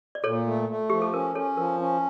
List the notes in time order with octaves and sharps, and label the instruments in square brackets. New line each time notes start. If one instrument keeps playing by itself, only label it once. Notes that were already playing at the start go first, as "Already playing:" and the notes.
[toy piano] D5
[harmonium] A#2 [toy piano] A4 C#5
[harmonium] A3
A3
[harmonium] F3 [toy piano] G4
[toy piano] A4
[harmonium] C#4 [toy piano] A#4
[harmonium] C#4 [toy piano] A4 C#5
[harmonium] F3 [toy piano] A#4
[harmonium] C#4